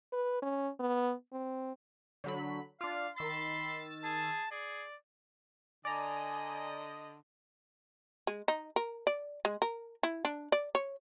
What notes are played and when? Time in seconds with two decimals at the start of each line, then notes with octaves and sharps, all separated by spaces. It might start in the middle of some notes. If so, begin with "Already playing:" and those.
0.12 B4
0.42 C#4
0.79 B3
1.33 C4
2.24 D3 F#3 B5
2.81 D4 F4 F5
3.16 D#3 B5 C6 E6 A6
4.04 G#4 A5
4.51 G#4 D5
5.85 D3 D5 D#5 G#5 A#5
8.27 G#3
8.48 D#4
8.76 A#4
9.07 D5
9.45 G#3
9.62 A#4
10.03 E4
10.25 D4
10.52 D5
10.75 C#5